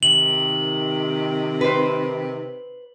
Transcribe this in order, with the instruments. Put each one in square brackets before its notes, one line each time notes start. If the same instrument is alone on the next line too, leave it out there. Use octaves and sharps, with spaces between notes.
[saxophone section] C3 D#3 [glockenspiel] F#7
[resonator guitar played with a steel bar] B4 C5